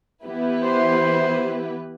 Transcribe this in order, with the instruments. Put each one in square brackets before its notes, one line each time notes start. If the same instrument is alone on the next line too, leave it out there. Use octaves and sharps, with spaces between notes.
[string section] E3 B3 E4 G4 B4
[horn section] C5